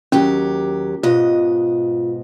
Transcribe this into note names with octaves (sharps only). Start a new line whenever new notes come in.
D#2 F#3 C#4 G4
G#2 B2 F4 D#5